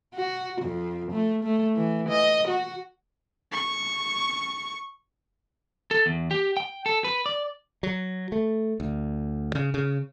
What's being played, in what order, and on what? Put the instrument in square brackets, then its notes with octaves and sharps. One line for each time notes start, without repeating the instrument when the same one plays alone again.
[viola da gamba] F#4
F2
A3
A3
E3
D#5
F#4
[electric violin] C#6
[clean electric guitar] A4
E2
G4
G5
A4
B4
D5
[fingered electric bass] F#3
A3
D2
C#3
C#3